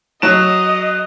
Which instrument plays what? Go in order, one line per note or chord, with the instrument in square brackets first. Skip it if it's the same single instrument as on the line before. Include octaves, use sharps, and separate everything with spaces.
[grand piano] F#3 E7 [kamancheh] D#5